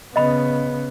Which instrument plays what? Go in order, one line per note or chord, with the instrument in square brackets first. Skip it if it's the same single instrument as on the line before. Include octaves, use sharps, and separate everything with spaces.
[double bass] C#3 B3 [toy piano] D#5 B5